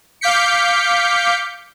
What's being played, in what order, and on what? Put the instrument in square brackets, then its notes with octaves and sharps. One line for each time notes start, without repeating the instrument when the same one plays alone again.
[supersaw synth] F5 D6 G6 B6 C#7